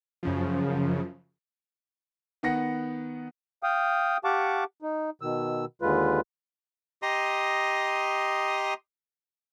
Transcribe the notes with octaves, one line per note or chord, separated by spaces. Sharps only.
F#2 C#3 F3
D#3 B3 F#5 A#6 C#7
F5 G5 D#6
G4 F5 F#5 A5 C#6 D6
D#4
B2 D#3 E6
D#2 D3 G#3 F4 B4
G4 D#5 A#5 C6 D#6